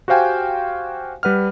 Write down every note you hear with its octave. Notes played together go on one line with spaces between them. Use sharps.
F#4 G4 C5 F5 G5 G#5
G3 B4 F#5 F6